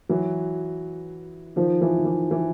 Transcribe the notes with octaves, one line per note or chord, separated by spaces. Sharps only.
E3 F#3
D#3 F3
E3
D#3
E3
E3